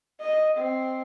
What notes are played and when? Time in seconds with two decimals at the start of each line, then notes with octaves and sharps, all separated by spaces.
0.20 D#5
0.57 C4